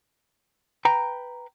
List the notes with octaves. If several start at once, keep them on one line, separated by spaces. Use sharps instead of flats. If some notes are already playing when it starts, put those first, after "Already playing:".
B4 G5 A#5